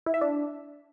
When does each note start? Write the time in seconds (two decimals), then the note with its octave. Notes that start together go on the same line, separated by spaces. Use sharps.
0.06 E4
0.14 E5
0.21 D4